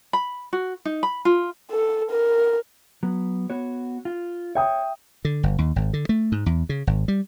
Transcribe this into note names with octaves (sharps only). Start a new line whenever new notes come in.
B5
F#4
D#4
B5
F4
A4
A#4
F#3 B3
B3 F#4 C#5
F4
C#5 E5 G5 D#6
D3
G1
D#2
G#1
D3
A3
G#2
E2
C#3
G#1
G3